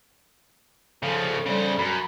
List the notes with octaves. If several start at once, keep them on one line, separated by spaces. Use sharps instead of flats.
C#3 F3 A4
C#3 G3 C5
F#2 B5